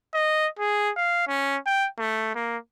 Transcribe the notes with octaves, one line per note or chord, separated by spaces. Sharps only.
D#5
G#4
F5
C#4
G5
A3
A#3